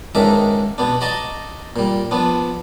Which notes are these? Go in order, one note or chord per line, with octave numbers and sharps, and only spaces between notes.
C#2 G#2 D#3 D4 A#4 E5
B2 B3 D4
F#4 D5 D#5 A5 A#5
A#2 G3
F3 B3 D4